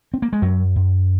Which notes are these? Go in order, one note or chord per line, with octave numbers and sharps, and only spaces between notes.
C4
A#3
G#3
F#2 F#3
F#2